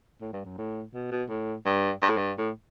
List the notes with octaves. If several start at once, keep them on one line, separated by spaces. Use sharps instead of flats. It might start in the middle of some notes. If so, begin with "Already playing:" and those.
A2
G2
F#2
A2
B2
B2
A2
G2
G2
A2
G2
A2